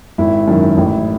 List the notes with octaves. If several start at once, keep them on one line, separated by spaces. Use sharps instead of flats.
G#1 E4
F#2 D#3
A1